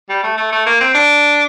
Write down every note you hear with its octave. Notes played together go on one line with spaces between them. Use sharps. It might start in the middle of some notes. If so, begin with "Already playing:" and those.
G3
A3
A3
A3
A#3
C4
D4